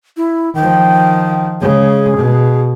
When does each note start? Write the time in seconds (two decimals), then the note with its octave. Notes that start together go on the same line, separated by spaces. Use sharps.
0.17 E4
0.55 D#3 F3 G5
1.61 C#3 G#3 G#4
2.16 B2